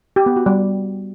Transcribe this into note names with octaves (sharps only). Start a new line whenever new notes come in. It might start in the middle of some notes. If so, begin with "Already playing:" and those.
G4
B3
F#4
G3